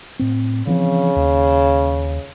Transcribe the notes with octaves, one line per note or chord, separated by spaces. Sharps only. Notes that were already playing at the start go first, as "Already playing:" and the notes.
A2 C4
C#3 E3 F3 C4
D#2